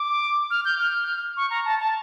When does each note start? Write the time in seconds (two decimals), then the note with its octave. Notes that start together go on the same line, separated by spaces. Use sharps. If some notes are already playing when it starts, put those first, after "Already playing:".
Already playing: D6
0.51 F6
0.65 G6
0.79 F6
1.37 C#6
1.50 A#5
1.65 A5
1.79 A5